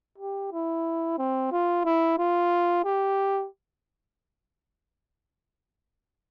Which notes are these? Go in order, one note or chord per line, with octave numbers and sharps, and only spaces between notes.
G4
E4
C4
F4
E4
F4
G4